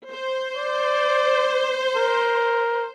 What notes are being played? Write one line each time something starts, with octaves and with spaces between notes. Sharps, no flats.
C5
D5
A#4